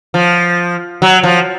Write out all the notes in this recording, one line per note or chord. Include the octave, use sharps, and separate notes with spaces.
F3
F#3
F3